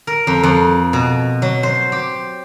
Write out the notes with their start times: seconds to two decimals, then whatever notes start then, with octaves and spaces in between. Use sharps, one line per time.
0.07 A#4
0.27 F2
0.43 F2
0.93 B2
1.42 F#3
1.63 C5
1.92 G4